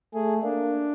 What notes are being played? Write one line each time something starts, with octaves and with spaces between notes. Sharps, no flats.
A3 G#4
A#3 D4